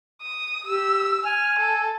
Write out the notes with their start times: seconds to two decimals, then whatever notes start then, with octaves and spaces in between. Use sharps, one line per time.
0.22 D#6
0.66 G4 E6
1.25 G#5 F6
1.59 A4